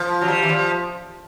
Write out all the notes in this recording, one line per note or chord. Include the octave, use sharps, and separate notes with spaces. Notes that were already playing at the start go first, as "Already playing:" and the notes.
Already playing: F3
F#3
G3
E3
F3